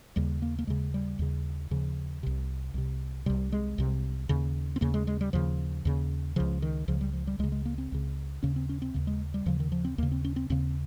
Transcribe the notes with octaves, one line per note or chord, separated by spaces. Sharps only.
D#2 C#3 G3
A#3
A#3
D#2 C#3 G#3
G3
D#2 C#3
D#2 C#3 F3
C2 C3
C2 C3
C2 C3 G3
G#3
C2 C3
D#2 C#3
C4
D#2 C#3 A#3
G#3
G#3
G3
D#2 C#3 F3
D#2 C#3
C#2 C#3 F3
D#3
C#2 C#3 F3
G3
F3
G3
C#2 C#3 G#3
G#3
A#3
C4
C#2 C#3
D#2 C#3 C#4
C4
C#4
C4
D#2 C#3
G#3
G3
D#2 C#3 F3
D#3
F3
C4
D#2 C#3 A#3
C4
C#4
C4
D#2 C#3 C4